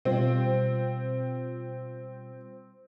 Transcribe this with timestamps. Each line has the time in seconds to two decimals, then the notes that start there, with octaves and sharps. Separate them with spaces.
0.05 B2 G3 C4 F4